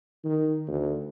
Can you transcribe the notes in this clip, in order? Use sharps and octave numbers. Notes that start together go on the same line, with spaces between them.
D#3
D2